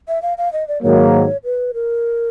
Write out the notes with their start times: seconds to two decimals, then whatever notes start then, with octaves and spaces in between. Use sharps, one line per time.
0.08 E5
0.22 F5
0.38 F5
0.53 D#5
0.68 D5
0.83 G#2 D#3 F#3 A#3 C#5
1.44 B4
1.74 A#4